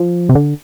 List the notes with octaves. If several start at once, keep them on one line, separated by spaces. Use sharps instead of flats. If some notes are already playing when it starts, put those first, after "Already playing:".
Already playing: F3
C3
D3